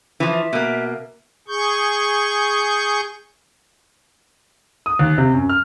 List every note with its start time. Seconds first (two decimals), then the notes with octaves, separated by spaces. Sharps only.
0.20 E3 F3
0.34 E5
0.53 B2 A#3
1.48 G#4 C#6 G6
4.86 D#6
4.99 D#2
5.18 C3
5.34 F#2
5.49 F6